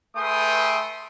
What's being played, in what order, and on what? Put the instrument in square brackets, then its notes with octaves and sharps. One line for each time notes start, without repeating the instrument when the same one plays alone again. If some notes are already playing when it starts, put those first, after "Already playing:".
[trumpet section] A3 G#4 B4 G5 C6 D#6